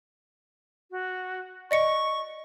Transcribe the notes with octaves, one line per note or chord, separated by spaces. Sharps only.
F#4
D5 D#5 C#6 C#7